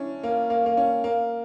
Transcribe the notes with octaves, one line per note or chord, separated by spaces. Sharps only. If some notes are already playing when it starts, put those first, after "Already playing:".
Already playing: C#4 D4 E4
A#3
A#3
A#3
C#4
A#3